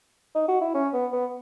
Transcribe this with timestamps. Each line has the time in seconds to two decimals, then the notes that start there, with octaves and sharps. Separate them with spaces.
0.35 D#4
0.48 F#4
0.61 E4
0.74 C#4
0.93 B3
1.12 B3